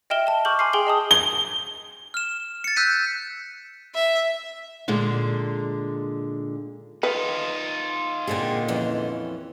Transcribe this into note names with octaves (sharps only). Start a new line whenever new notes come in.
D#5 E5 G5 F6 E7 G7
A5 E7
C#6 D6 F6 G6 F#7
G#5 C6 D6 F6 C7
G#4 G5 G#5 F#7 G7
G#4 D#5 A5 D#6
G7
F6 E7
A6 C#7
E6 F#6 G6 B6 D#7
E5
A#2 D3 G#3
D#4 F4 B4
A#2 D3 C4 G#4
F2 E3 C#4